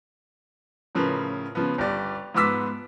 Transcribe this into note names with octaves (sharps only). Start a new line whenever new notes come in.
A2 C#3 F3 A#4 B4
C#3 F3 B3
G1 G3 D5
G#2 F3 B3 D6 E6 B6